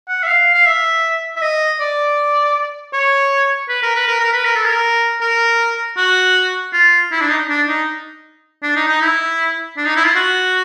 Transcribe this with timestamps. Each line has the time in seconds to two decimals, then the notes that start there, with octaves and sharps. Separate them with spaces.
0.08 F#5
0.23 E5
0.27 F5
0.55 F5
0.66 E5
1.36 E5
1.41 D#5
1.80 D5
2.93 C#5
3.69 B4
3.83 A#4
3.95 B4
4.08 A#4
4.20 A#4
4.33 B4
4.45 A#4
4.55 A4
4.65 A#4
5.21 A#4
5.97 F#4
6.73 F4
7.12 E4
7.21 D4
7.29 D#4
7.49 D4
7.68 D#4
8.62 D4
8.76 D#4
8.88 D#4
9.01 E4
9.77 D4
9.86 D#4
9.96 E4
10.05 F4
10.15 F#4